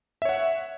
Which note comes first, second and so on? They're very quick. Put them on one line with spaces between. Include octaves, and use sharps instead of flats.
E5 C#5 F#5